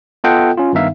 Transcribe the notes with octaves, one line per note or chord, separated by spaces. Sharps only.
B3 F4 A4 D#5 F#5 G5
C#4 F4
G2 D#3 B3 D#4 E5 F5